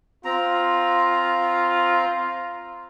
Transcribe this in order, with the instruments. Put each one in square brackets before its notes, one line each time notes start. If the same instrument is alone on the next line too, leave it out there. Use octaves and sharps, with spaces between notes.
[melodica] C4 A#5 [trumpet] F4